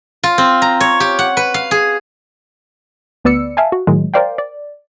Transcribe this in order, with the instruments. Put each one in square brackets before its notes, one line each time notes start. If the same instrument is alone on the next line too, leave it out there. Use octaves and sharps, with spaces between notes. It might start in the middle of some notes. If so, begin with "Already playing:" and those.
[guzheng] F4
C4
A#5
C#5
G4
F#5
B4
F5
G#4
[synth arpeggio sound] D2 B3 B4 D5 E6 C#7
E5 F5 G#5 A5
F#4
A2 D#3 F#3 G#3
A#4 C5 D5 F5 G5
D5